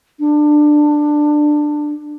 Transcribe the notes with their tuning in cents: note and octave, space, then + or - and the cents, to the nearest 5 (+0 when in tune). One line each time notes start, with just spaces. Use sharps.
D4 +15